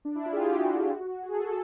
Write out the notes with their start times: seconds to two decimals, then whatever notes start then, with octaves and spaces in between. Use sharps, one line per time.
0.05 D4
0.16 E4
0.26 F4
0.33 G#4
0.36 G4
0.48 F#4
1.23 G#4
1.33 A4